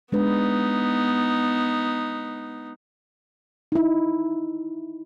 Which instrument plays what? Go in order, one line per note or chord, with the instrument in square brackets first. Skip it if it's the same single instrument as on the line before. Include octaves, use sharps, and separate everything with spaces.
[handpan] G#3 D4 B4 [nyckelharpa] B3 D#4
[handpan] D#4 E4